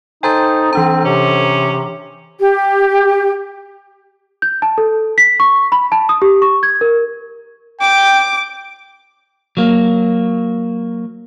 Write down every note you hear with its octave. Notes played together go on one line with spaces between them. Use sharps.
D#4 A4 C5 G5 G#5 A#5 A6
E3 C4 D4 A#5
C3 C#4
G4
G6
A5
A4
B6
C#6
B5
A5
D#6
G4
C#6
G#6
A#4
G5 D6
F#3 A#3